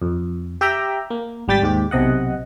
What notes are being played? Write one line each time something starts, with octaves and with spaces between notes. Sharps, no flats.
F2
G4 E5 G5 A#5
A#3
G#1 G3 G5 A6 B6
D#2 G#2 G4
B1 C3 D#5 F#5